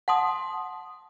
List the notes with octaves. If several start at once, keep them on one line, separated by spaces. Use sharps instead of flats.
F#5 A5 C6 D#6